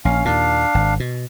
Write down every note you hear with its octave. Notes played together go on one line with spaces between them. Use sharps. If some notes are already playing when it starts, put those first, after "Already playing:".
A#1 C#4 F5
D#2 A#2 D4 F5
G#1
B2